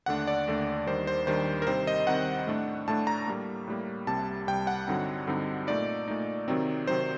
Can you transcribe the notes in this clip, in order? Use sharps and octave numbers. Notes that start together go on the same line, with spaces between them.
D#2 D3 A3 D4 F#5
D5
D#2 D3 A3 D4
D#2 D#3 G3 D4 C5
C5
D#2 D#3 G3 D4 C5
A#4
C3 D#3 G3 C4 D#4 C5
D#5
C3 D#3 G3 C4 D#4 F#5
A2 A3 D4
A2 A3 D4 A5
A#5
A2 G3 A#3
A2 G3 A#3
C2 C3 G3 A5
C2 C3 G3 G5
F#5
G2 D3 F#3 C4 D#4
G2 D3 F#3 C4 D#4
A#2 A3 D#4 D5
A#2 A3 D#4
C3 D#3 F#3 C4 D#4
C3 D#3 F#3 C4 D#4 C5